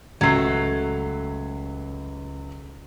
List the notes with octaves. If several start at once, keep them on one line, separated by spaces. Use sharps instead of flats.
C#2 F#3 A3 C7